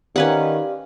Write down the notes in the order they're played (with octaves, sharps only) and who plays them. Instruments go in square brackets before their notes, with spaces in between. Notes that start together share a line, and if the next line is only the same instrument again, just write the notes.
[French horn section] D#3 [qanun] C#4 B4 F#5 [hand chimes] G4 D5 F5